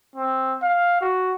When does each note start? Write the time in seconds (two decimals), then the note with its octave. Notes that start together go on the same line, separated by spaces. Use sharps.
0.16 C4
0.62 F5
1.01 F#4